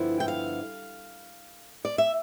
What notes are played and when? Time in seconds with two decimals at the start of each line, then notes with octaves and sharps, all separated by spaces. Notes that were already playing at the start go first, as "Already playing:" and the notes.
Already playing: G2 D3 F3 B3 E4
0.20 G5
0.28 F5
1.85 D5
1.98 E5